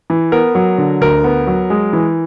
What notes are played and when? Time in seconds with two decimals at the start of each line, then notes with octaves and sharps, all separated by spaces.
0.10 E3
0.32 B3 A#4
0.55 F#3
0.78 D3
1.01 D2 A#4
1.24 B3
1.47 F#3
1.70 G#3
1.93 E3